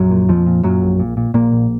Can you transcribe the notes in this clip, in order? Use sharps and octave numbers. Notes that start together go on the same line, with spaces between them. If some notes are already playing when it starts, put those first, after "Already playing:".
Already playing: A#1 F#2 F#3
A#2
F2 A#2 F3
A#2
F#2 A#2 F#3
A#1
A#2
A#2
A#1 A#2 A#3
A#1